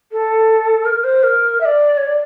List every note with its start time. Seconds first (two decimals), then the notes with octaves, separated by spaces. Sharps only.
0.11 A4
0.85 A#4
1.04 C5
1.23 A#4
1.60 E5
1.65 D5
1.97 C#5
2.06 D5